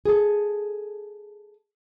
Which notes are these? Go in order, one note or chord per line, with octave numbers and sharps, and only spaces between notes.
G#4 A4